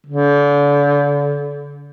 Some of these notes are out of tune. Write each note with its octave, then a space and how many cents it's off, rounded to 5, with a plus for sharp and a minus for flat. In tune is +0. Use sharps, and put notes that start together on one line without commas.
D3 -35